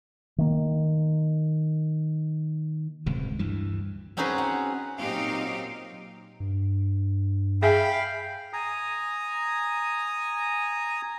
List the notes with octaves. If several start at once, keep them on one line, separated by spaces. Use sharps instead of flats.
D#3 A#3
D1 G1 C#2 C3
D2 G2 E3
C4 C#4 D#4 F#4 G#4 B4
F#5
A#2 F#3 C4 D#4 G4 F5
G2
G#4 E5 F5 G5 G#5 B5
G#5 A#5 D#6